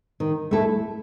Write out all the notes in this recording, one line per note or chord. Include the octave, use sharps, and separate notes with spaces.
D#3
A3 E4 A4